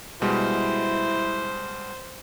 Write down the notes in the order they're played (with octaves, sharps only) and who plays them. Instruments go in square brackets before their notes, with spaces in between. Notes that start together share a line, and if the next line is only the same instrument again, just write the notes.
[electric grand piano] B2 G3 G#3 [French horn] E4 [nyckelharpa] C5